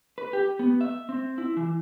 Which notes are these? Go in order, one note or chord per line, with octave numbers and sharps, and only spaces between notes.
B4
G4
B3
E5
C4
E4
E3